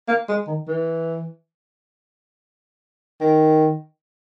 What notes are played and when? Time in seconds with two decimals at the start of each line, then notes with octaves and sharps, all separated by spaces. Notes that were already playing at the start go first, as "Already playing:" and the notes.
0.08 A#3
0.29 G#3
0.47 D#3
0.67 E3
3.21 D#3